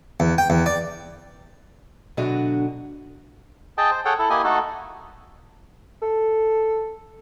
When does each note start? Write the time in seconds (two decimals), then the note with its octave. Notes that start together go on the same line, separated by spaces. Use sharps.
0.20 E2
0.38 G5
0.50 E2
0.66 D5
2.17 B2 D3 F#3 D4 F#4 D#5
3.78 G#4 D#5 G5 A5
3.91 C5
4.05 G#4 A4 C#5 F#5 G5
4.19 E4 A4
4.30 A#3 E4 G4 D#5 G#5
4.44 A3 D#4 F#4 A4
6.02 A4